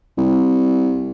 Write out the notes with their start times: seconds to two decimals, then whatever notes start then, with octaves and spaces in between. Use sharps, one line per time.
0.18 C2